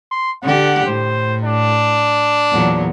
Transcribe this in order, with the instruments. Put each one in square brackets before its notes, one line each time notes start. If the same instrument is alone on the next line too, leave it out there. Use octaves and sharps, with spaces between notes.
[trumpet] C6
[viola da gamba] D3 G4 [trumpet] F#5
[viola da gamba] A2 [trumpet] C5
[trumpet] D4
[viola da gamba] E2 A#2 F#3